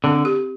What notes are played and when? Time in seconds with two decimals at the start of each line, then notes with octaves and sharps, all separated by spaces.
0.04 D3 C4
0.25 G4